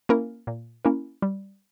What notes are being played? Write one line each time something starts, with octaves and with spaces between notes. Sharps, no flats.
A#3 C#4 E4 A#4
A#2
A#3 C#4 E4 A#4
G3